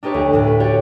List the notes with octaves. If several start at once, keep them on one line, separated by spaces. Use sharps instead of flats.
D4 D#4 G4 B4 C#5
D2
D2 A2
B4
F#4 G4 C#5 D5